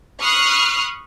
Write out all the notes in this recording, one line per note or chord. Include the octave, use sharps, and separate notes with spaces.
B5 C#6 D#6 F6 F#6 C7